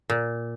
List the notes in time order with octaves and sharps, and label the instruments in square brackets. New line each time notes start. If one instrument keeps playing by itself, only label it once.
[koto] A#2